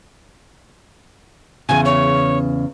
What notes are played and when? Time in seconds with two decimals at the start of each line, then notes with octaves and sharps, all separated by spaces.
1.69 E2 C#3 G#5
1.85 C#5